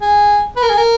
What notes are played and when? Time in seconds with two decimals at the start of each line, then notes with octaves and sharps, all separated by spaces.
0.02 G#4
0.56 B4
0.63 A#4
0.70 G#4
0.78 A#4